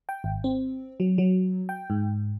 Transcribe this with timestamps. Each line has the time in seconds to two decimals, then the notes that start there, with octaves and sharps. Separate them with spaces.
0.09 G5
0.24 G#1
0.44 C4
1.00 F#3
1.18 F#3
1.69 G5
1.90 G#2